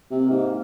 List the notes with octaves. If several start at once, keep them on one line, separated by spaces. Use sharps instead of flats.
C3 A#3
G#2